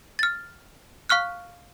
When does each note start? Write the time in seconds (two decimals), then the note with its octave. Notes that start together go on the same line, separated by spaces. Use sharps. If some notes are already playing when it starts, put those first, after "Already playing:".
0.19 F6 A6
1.09 F5 C#6 F6 F#6